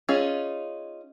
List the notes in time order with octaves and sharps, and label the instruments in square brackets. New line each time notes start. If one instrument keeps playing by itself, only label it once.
[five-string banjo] C#4 D#4 F4 G#4